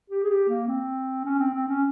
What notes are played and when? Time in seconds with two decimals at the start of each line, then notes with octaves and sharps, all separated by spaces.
0.10 G4
0.23 G#4
0.30 G4
0.49 A#3
0.68 C4
1.25 C#4
1.39 C4
1.54 C4
1.68 C#4